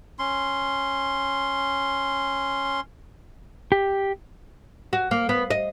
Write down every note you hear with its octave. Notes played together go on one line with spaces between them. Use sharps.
C#4 C6
G4
F#4
A#3
B3
D#5